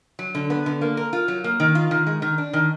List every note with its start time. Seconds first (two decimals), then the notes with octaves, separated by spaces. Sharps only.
0.19 F#3
0.35 D3
0.50 B3
0.66 D3
0.81 A#3
0.97 A#4
1.13 F4
1.28 F#3
1.44 A#3
1.60 D#3
1.75 F4
1.91 D#3
2.07 G#3
2.22 D#3
2.38 D4
2.53 D#3